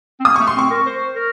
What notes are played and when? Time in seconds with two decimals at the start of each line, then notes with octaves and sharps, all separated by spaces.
0.20 C4
0.25 A#3 D#6
0.36 A3 C#6
0.47 C6
0.55 C4 C#6
0.71 A#4
0.86 C5
1.16 A#4